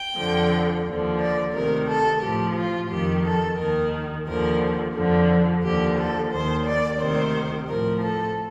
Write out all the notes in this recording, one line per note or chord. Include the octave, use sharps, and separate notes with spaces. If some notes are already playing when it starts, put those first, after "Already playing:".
Already playing: G5
F2 D3 F3
D#2 D3 F3
D5
D2 C3 D#3 A#4
A4
A2 F3 G4
F4
F2 D#3 G4
A4
D#2 D#3 A#4
D#2 D3 F3 A#4
F2 D3 F3
D#2 D3 F3 G4
A4
D#2 D#3 C5
D5
D2 C3 D#3 C5
A2 F3 A#4
A4